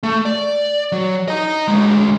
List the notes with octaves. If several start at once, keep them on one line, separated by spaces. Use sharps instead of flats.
A3
D5
F#3
D#5 A#5
D2 G#3